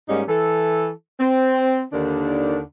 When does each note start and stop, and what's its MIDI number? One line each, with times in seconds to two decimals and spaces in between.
0.09 0.23 44
0.09 0.23 55
0.09 0.23 58
0.09 0.23 61
0.09 0.23 63
0.29 0.90 52
0.29 0.90 64
0.29 0.90 69
1.20 1.83 60
1.93 2.61 39
1.93 2.61 50
1.93 2.61 51
1.93 2.61 62